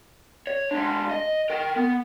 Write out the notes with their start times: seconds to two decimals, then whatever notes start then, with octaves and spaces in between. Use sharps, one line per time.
0.47 C#5
0.71 G#3 D4
1.11 D#5
1.50 A#4 G5
1.76 B3